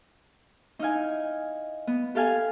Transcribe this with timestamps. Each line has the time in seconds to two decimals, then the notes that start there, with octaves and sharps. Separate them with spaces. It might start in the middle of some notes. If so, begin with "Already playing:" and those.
0.79 D#4 E4 F5 G#5
1.87 B3
2.15 G4 A4 F5 G#5